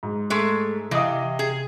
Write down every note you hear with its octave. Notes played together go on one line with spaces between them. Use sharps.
G#2
G#3 A3
C3 E3 D#5 F5 D#6
G#4